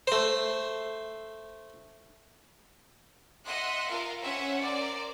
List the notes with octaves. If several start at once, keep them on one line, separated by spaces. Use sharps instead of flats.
A3 C5
D#5 E5 F#5 C6 F#6
F4 A#4 F5
C#4 C5 C#5 E5 F#5
A#4 C5 D5